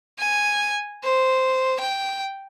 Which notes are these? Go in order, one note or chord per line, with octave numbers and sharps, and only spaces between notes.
G#5
C5
G5